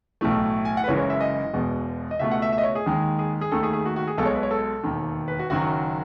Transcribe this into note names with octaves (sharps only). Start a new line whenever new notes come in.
B1 A2 E3 A3
G#5
F#5
B4
F#1 F#2 E3 G#3 C#5
C#5
E5
D#5
E1 E2 B2 G#3
D#5
C#2 B2 A3 E5
F#5
E5
E5
D#5
C#5
G#4
D#2 D#3 G#3
G#4
G#4
D#2 D#3 A3 A4
G#4
G#4
F#4
F#4
G#4
B1 B2 G#3 A4
C#5
B4
C#5
A4
E1 D#2 D#3
B4
F#4
F#1 F#2 D#3 F#3 F#4